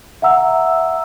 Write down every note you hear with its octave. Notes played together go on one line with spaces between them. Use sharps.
E5 F#5 A#5 E6